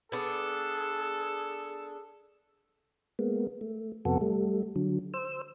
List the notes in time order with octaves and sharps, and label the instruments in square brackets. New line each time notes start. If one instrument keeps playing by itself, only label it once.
[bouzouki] B3 D4 [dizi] G#4 [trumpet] A4
[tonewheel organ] G#3 A#3 B3
A3
F2 C3 B3 F#4 A4
G3 A3
D3 F#3
C5 E6